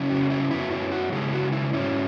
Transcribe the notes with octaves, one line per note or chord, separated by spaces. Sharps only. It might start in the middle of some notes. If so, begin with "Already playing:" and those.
Already playing: C#3 F#3 C#4 E4
F#4
E4
F#2 F#3 B3 E4
E4
F#4
C#3 G#3 E4 G#4
F#4
E4
G#2 F#3 C#4 E4